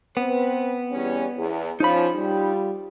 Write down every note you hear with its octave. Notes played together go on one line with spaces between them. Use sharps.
B3 C4 B4
E2 G3 C#4
E2
F3 C#4 D#4 B5
G3 F4